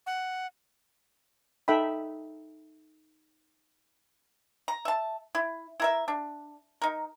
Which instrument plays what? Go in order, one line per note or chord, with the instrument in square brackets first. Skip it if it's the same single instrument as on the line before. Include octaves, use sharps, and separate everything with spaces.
[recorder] F#5
[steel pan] D#4 A4 E5 G5 B5
[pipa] A#5
E5 A5
E4
E4 A#4 E5
D4
D#4 A#4